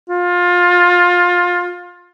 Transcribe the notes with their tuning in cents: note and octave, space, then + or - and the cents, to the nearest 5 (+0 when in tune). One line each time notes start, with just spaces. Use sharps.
F4 +20